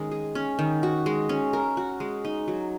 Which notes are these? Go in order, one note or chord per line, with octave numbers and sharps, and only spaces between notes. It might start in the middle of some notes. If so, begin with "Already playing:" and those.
Already playing: D#3 G#3 C#4
G#4
C#4
D#3
F#4
G#3
C#4
A#4
F#4
G#3
D#4
F#3